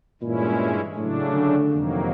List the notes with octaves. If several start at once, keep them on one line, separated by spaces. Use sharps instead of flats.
G2 A#2 E3 G#3 C#4 E4
A2 C#3 F#3 A3 D4
D3
F2 C3 D#3 F#3 A#3